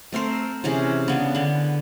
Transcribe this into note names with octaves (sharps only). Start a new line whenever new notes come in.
A3 C4 A#4 C5
C3 E3 C#4 G#4
C#3 B3 D4
D3 B3